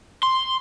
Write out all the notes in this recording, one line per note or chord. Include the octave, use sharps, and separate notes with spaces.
C6